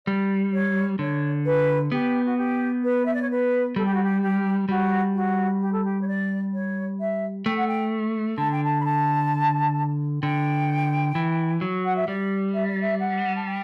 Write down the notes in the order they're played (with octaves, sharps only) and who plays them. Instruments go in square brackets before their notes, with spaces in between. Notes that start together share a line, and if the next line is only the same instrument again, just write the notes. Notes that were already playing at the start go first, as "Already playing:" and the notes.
[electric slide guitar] G3 [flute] D5
[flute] C#5
[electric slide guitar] D3 [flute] C#5
[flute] B4
[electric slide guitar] B3 [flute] G4
[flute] F#4
G4
B4
E5
D5
C#5
B4
[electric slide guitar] G3 [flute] A4
[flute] G4
F#4
G4
G4
[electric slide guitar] G3 [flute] F#4
[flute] F#4
G4
A4
G4
C#5
D5
C#5
E5
[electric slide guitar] A3 [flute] G5
[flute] F#5
G5
[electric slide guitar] D3 [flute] A5
[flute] G5
A5
B5
A5
[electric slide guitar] D3 [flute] G5
[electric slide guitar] E3
F#3
[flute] F#5
E5
[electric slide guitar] G3 [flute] D5
[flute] E5
D5
E5
F#5
A5
G5